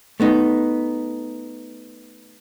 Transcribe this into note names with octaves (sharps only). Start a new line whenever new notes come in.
A3 B3 D#4